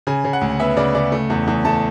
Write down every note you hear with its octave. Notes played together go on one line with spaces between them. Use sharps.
C#3 G#5
C#3
F#5
D2
B3 E5
C#3 D5
C#3 D5
A3
E2
E2
A3 A5